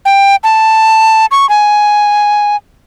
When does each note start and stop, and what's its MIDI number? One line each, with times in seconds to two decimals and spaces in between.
0.05 0.36 79
0.44 1.26 81
1.31 1.48 85
1.49 2.56 80